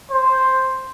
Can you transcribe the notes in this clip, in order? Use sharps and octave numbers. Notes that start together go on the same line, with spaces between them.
C5